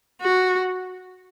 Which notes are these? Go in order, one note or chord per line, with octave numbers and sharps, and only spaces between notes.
F#4